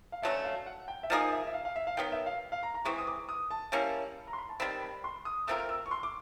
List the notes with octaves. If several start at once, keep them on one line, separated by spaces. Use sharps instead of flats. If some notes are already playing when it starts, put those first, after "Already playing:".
F5
D3 F#3 A3 C#4 E5
F5
F#5
G5
E5
F3 A#3 D#4 G#4 F5
E5
E5
F5
F5
E5
F5
D#3 F#3 B3 G5
E5
F5
F5
A#5
A#5
E3 G#3 C4 C#6
D#6
D6
D#6
A5
G3 A#3 C#4 E4
A#5
C6
B5
A5
D#3 G3 C4 B5
B5
C6
D#6
A3 C4 F4 A#4 E6
F6
E6
C#6
C6
D6